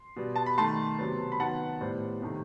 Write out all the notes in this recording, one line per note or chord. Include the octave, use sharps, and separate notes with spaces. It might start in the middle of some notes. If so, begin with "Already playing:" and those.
Already playing: C6
B2 G3 B3
A5
B5
D#3 A3 A5 C6
C3 F#3 B3
B5
D#3 F#3 B3 F#5 A5
A2 G3 B3 C5
C3 D#3 A3